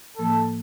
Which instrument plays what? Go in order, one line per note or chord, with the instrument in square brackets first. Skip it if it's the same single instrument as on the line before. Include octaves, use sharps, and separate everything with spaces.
[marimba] A2 F3 A#3 [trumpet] A4